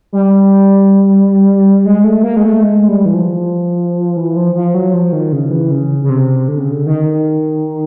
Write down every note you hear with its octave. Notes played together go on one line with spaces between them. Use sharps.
G3
G#3
A3
A#3
G#3
A3
G#3
G3
E3
F3
E3
F3
F3
F#3
F3
D#3
C#3
E3
C#3
C#3
C3
D3
C#3
D3
D#3